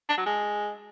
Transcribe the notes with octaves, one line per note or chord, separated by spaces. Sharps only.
D4
F#3
G#3